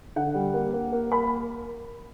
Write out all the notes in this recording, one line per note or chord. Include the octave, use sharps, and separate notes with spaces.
D3 F#5
G3
A#3
A#3
A#3
A#3 B5